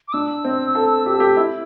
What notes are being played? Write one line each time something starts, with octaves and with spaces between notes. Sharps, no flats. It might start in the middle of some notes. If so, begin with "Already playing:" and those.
D6
D4 E6
C4
A4
G4
A4
G4
E4